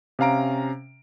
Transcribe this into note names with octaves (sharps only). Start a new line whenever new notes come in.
C3 C#4 F5 A#5 D7